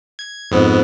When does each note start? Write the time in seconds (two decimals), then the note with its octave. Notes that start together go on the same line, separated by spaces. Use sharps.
0.19 G#6
0.51 F2 G#2 B3